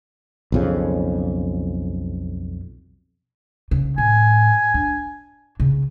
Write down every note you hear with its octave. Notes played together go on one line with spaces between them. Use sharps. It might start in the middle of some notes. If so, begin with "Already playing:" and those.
B1 F2 C#3
C#3
A2 G#5
D4
C#3